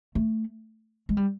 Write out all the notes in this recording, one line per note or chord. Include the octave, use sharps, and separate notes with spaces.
A3
G#3
G3